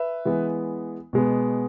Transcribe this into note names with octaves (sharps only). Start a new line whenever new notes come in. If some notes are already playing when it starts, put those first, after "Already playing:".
Already playing: B4 E5
E3 G#3 B3
B2 G#3 B3